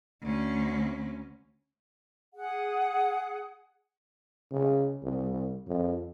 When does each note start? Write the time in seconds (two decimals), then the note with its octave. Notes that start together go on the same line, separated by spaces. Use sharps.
0.22 D2 C#4
2.34 G#4 F#5
4.51 C#3
5.02 C2
5.67 F2